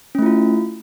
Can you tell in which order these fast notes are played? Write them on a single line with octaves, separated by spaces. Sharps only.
C#4 A3 E4 F4